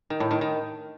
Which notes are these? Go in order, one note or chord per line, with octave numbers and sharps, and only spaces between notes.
D#3
A2
D#3
D#3